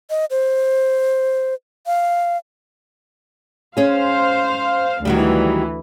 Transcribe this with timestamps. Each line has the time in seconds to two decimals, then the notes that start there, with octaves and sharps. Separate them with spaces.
0.10 D#5
0.31 C5
1.87 F5
3.77 C#4 G#4 C5 F5
5.05 D2 D#3 E3 F#3 G3